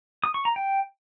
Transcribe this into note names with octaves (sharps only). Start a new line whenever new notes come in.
D#6
C#6
A#5
G5